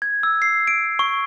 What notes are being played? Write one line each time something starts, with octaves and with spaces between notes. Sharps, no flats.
G#6
E6
C7
D7
C#6